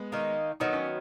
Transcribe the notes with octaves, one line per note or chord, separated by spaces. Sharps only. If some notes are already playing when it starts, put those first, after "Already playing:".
Already playing: G#3 B3
D#3 A#3 D#4
D#3 F#3 B3 D#4
C#4